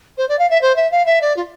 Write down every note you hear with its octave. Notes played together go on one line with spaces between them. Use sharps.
C5
D5
F5
E5
C5
E5
F5
E5
D5
F4